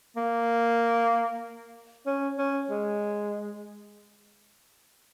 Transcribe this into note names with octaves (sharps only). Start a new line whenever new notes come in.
A#3
C#4
C#4
G#3